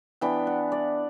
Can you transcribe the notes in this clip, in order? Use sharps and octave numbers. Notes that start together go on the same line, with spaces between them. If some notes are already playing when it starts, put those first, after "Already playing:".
E3 B3 D4 G5
F#5
D5